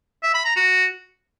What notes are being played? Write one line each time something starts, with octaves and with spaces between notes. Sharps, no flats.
E5
B5
A#5
F#4